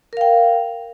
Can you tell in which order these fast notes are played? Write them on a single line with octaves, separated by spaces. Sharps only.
A#4 F5 G5